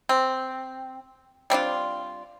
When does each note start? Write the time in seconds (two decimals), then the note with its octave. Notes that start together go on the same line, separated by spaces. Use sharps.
0.09 C4
1.50 G3 C4 D4 F4